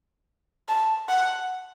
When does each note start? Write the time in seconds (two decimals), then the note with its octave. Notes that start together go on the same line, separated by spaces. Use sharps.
0.69 A5
1.09 F#5